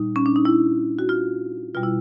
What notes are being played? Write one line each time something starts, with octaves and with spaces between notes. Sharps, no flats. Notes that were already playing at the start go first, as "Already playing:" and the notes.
Already playing: A#2 G3 D#4
C#4
D4
D#4
E4
F#4
F4
B2 G3 F4
E4